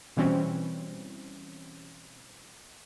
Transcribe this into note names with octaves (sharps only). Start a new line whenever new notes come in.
B2 E3 G3 C4 C#4